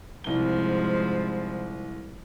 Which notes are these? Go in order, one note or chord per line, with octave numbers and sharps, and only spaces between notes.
C2 G#2 F3 G7